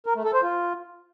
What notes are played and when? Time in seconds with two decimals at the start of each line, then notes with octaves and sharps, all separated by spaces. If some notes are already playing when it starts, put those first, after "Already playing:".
0.06 A#4
0.15 A3
0.24 A4
0.34 C5
0.43 F4